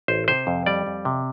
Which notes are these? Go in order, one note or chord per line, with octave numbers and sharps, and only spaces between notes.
A1 C5
C3 C5
F2
G3 D5
F2
C3